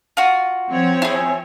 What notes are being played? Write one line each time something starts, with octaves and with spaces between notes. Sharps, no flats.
F4 F#4
F3 C4 C#5
E4 G#4